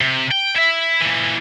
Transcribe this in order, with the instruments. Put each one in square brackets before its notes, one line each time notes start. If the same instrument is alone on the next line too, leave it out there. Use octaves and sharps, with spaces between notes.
[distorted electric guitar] C3
G5
E4 E5
A#2 E3